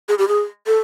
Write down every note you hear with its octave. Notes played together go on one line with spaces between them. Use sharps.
G#4
G4
G#4
A4